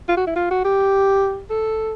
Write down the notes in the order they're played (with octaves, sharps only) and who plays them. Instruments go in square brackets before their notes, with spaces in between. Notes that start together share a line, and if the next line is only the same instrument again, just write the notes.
[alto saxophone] F4
F#4
E4
F4
F#4
G4
A4